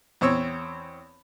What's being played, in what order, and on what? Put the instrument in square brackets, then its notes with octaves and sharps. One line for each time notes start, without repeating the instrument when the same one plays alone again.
[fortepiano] E2 C4 C#5 E6